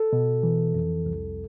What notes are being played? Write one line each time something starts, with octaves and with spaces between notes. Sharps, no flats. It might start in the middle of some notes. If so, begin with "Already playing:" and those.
Already playing: A4
B2
E3
F2
C2